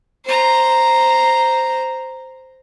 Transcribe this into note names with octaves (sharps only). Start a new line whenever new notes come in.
C5 A#5